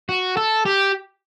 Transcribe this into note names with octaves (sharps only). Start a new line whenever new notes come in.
F#4
A4
G4